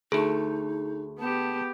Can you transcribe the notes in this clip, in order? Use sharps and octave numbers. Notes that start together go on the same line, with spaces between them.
D2 A3 D#4 G#4
B3 G4 A5